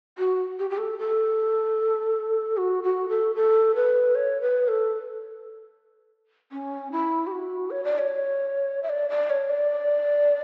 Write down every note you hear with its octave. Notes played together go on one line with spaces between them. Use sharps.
F#4
G4
G4
A4
A4
F#4
F#4
A4
A4
B4
C#5
B4
A4
C#4
E4
G4
F#4
C#5
D5
C#5
E5
D5
D5
C#5
D5